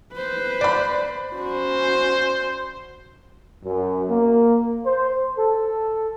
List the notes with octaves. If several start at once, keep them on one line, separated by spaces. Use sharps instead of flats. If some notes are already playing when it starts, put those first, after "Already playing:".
B4 C5
D5 B5
C#4 F#4 C5
F#2
A#3
C5
A4